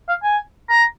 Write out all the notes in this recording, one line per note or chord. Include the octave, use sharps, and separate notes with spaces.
F5
G#5
A#5